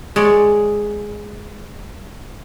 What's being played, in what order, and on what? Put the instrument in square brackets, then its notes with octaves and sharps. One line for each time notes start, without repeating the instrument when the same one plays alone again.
[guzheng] G#3 C#5 D5